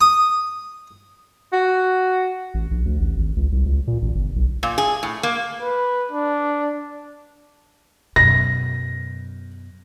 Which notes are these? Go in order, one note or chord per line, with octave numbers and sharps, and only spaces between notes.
D#6
F#4
A1
A#1
D2
A1
G#1
C#2
C2
C#2
A#2
A1
G1
B1
A#2
G#4
A2
A#3
B4
D4
F#2 B2 A#6